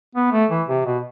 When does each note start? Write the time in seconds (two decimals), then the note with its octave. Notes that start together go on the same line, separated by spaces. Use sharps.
0.15 B3
0.32 A3
0.50 E3
0.68 C3
0.86 B2